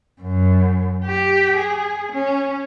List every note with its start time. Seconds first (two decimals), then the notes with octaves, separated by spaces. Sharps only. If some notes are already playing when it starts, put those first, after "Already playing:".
0.22 F#2
1.05 G4
1.56 G#4
2.12 C#4